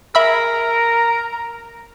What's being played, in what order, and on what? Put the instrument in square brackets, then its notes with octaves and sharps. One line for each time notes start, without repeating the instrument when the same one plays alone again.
[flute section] G#4 [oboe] A#4 [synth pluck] E5 B5 E6
[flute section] A#5